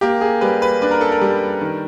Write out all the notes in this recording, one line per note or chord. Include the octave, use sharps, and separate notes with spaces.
A#3 G4
G#4
G3 B4
B4
D4 B4
A#4
A4
A#4
G3
D#3